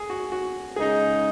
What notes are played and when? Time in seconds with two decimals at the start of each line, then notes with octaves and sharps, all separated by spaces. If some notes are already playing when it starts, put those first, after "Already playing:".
Already playing: G#4
0.10 F#4
0.32 F#4
0.76 C#3 G#3 D#4 G#4